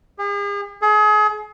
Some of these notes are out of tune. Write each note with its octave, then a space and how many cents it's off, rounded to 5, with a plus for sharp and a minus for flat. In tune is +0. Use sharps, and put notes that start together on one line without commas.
G#4 -45
G#4 +35